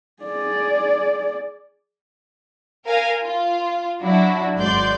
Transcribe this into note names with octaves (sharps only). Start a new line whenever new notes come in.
G#4 D5
A#4 F5 G#5
F4
F#3 D4 E4 F#4
G#1 G#3 F#4 D5 C6 G6